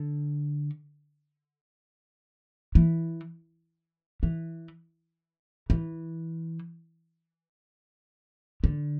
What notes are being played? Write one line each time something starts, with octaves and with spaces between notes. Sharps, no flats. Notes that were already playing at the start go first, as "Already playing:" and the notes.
Already playing: D3
E3
E3
E3
D3